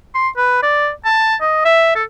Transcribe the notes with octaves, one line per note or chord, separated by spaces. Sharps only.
C6
B4
D5
A5
D#5
E5
A4